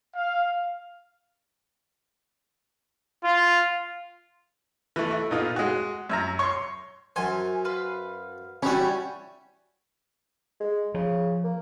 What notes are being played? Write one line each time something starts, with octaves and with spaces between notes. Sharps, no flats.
F5
F4
E3 A3
A3 E4
A#2 B3 D#4 F4
G#3 F#4
F#2 E5 A#5
C#5 C6
F#2 C5 G#5
B4 F5 C6
G3 C#4 E4 F#4 C#5
G#3
C#3 F3
A#3